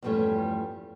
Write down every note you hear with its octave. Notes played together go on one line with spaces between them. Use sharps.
E2 G2 F3 G3 A3 C#4